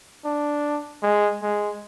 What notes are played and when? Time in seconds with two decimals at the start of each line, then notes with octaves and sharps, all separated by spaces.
0.25 D4
1.02 G#3
1.42 G#3